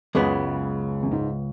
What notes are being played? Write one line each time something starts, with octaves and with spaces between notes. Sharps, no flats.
C#2 F#2 C#3 G#3 B3
F#2
G#2